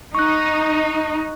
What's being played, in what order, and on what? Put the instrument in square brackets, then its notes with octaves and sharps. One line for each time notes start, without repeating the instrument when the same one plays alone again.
[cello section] D#4 [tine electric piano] C#6 F#6